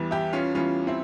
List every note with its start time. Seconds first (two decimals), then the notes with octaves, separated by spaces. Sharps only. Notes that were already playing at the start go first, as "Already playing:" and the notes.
Already playing: E2 E3 G3
0.11 E4 G4
0.33 C#4 F4
0.55 E2 E3 G3 C#4 F4
0.87 C4 E4